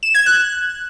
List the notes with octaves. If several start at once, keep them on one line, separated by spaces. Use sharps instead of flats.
E7
G#6
F#6